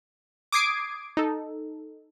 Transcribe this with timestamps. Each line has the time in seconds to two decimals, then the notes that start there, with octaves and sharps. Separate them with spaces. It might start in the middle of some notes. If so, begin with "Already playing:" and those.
0.52 D6 D#6 G#6 C7 D7
1.17 D#4 A4